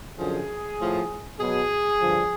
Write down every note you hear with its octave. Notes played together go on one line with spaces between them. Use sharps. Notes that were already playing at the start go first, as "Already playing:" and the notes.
F#2 D3 F3 G#4
A2 F3
B2 F#3 G#4
G2 D3 F3